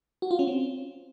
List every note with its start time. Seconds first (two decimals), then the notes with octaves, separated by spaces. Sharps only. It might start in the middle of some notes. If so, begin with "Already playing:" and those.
0.22 F#4
0.31 F4
0.39 C#4
0.47 C4